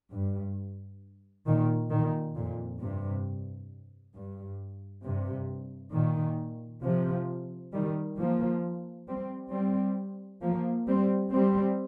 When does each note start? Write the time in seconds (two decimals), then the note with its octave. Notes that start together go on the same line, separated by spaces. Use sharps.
0.13 G2
1.47 A#2 D#3
1.91 A#2 D#3
2.36 F2 A#2
2.81 G2 C3
4.15 G2
5.05 G2 C3
5.94 A#2 D#3
6.84 C3 F3
7.73 D#3 G3
8.18 F3 A#3
9.08 G3 C4
9.52 G3 C4
10.42 F3 A#3
10.87 G3 C4
11.32 G3 C4